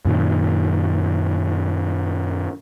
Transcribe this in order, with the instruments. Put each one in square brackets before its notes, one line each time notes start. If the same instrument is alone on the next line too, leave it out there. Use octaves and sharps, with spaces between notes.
[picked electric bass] F#2 A#2 D#3